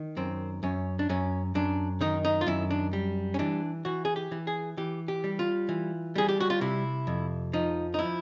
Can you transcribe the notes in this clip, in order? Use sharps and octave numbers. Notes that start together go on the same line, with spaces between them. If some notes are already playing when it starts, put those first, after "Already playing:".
Already playing: D#3
F#2 C4
F#2 C#4
D4
F#2 C#4
F#2 D4
D#3 D#4
D#4
F4
F#2 E4
D4
G3
C#4
E3 D4
E3 F#4
G#4
G4
E3
G#4
E3 G4
G4
G3
F4
E3
G3 G#4
G4
F#4
F4
C3 E4
F2
F3 D#4
D#4
F3 E4